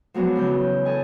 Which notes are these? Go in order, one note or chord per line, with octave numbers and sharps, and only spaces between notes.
F3 F#3 G#3 B3 D4
E2 C#3 G6
A4 D#5 G#5